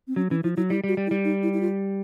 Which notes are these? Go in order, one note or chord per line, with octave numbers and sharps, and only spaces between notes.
C4
F#3 C#4
E3 C#4
F3 E4
F#3 E4
G3 E4
G3 F#4
G3
E4
G3
D#4
E4
E4
F4